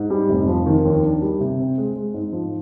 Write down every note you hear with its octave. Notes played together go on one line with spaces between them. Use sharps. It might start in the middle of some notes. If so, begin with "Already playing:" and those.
Already playing: G#2
G3
F1
F3
D#3
D#2
D4
G3
C3
C4
G#3
G#3
G#2
F3